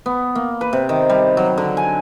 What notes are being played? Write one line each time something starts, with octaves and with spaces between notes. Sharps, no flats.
B3
A#3
B4
C3
D#3
G3
F#3
D3
G#5